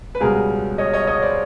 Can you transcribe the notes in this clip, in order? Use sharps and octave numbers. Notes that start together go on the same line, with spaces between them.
B4
C#2 B2 G3 G#4 A#4
C#5 D#5
C#5 D#5
C#5 D#5
C5 D5